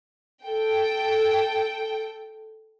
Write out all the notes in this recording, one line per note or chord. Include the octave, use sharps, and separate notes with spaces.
A4 G5